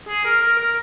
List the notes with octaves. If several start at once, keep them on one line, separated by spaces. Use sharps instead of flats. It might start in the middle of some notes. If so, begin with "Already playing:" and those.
G#4
A#4
A#4
A#4